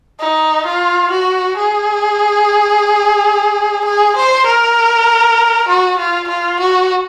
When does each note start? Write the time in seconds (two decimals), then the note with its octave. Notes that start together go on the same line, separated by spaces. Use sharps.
0.20 D#4
0.66 F4
1.11 F#4
1.57 G#4
3.85 G#4
4.16 C5
4.46 A#4
5.68 F#4
5.99 F4
6.28 F4
6.60 F#4